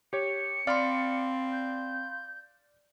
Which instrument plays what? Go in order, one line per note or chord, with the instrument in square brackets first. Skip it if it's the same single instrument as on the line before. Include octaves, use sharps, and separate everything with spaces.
[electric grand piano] G4 C#5 [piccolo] C#7
[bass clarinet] C4 [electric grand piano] D5 F6 [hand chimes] F5 B5 C6
[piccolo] G6